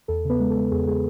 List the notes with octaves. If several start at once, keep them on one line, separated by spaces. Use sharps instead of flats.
E2 A4
C#3 B3 B4
G#3
A4
G#3
E2 G#4
G#3 G#4